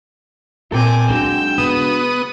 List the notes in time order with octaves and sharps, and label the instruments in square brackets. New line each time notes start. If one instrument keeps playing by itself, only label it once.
[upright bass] A#2 [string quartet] C4 G#5 D6 [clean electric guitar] A4 A#4 G5
[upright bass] F#3 D#4 [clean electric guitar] G#3 D4 F#4 [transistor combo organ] G5 [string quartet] E6
[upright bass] C#3 [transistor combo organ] B3 D#6